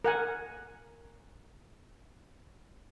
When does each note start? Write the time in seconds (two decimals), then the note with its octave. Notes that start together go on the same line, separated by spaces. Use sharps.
0.04 A#4 F#5 G#5